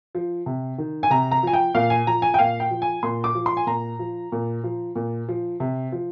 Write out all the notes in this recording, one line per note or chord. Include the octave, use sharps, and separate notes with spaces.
F3
C3
D#3
G#5
C3 A#5
A#5
F3 G#5
G5
A#2 F5
G#5
F3 A#5
G#5
G5
A#2 F5
G5
F3
G#5
A#2 C6
D6
F3
C6
G#5
A#2 A#5
F3
A#2
F3
A#2
F3
C3
F3